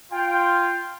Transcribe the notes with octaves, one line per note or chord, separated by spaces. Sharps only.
F4 G5